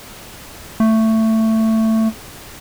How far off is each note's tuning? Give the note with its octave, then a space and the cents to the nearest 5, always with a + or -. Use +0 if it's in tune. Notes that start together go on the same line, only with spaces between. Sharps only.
A3 +15